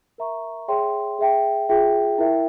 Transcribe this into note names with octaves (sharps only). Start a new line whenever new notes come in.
A#4 E5 A#5 C#6
G#4 C#5 E5 G5 C6
G#4 E5 G5
F4 G#4 E5 G5
E4 A#4 E5 G5